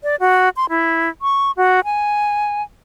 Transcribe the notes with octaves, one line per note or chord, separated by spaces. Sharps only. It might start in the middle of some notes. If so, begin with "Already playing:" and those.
D5
F#4
C6
E4
C#6
F#4
G#5